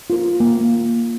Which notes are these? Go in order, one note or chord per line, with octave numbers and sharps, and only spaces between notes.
F4 A#4
A#3